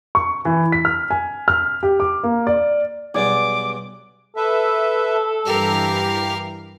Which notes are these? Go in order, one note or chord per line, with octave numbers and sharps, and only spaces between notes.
C#6
E3
B6
F6
G#5
F6
G4
D6
A#3
D5
B1 G2 B3 G#4 D5 D6
A4 B4 E5
G2 E3 G4 A#4 F5